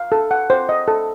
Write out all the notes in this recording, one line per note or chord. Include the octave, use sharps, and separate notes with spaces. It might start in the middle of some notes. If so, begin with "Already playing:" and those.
Already playing: F5
A4
F#5
C5
D#5
A4